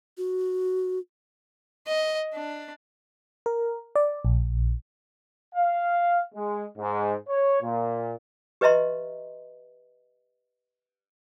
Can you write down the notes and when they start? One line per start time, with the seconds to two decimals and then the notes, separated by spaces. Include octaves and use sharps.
0.18 F#4
1.88 D#5
2.34 D4
3.46 A#4
3.96 D5
4.25 A#1
5.55 F5
6.35 G#3
6.77 G#2
7.27 C#5
7.62 A#2
8.61 G4 B4 D#5 E5 A#5 C6